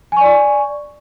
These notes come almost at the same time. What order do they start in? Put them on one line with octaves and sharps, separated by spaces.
G#5 C#6 D5